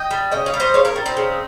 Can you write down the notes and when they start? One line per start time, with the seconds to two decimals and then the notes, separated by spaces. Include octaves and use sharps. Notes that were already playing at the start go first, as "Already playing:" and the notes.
Already playing: D#5 G5
0.11 G3
0.31 C#3 D#5 G5
0.46 C#5 F5
0.54 G3
0.60 C5 D#5
0.74 C#3 C#5 F5
0.85 A#4 C#5
0.96 G3
1.06 C4 D#4
1.17 C#3